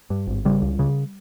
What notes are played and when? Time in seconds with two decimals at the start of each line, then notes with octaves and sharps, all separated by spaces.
0.10 G2
0.27 G#1
0.45 C#3 G3
0.62 C#2
0.79 C#3